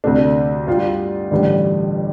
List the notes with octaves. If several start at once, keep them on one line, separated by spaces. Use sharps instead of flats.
D2 C3 A3 D4
G2 G3 F4
A1 G2 D3 G3